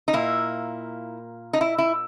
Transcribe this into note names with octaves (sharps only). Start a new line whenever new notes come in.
D#4
A#2 A#3 E4
D#4
E4
E4